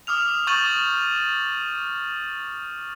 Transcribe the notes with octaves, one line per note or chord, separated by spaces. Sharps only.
D6 D#6 F6 F7
C#6 D#6 G6 A6 D#7 F#7